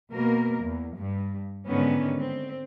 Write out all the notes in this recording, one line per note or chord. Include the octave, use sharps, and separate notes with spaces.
B2 A#3 A#4
E2
G2
G#2 D3 D#3 B3 C#4
C4